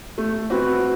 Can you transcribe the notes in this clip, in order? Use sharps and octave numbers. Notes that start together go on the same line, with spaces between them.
A3
C4 F#4 B4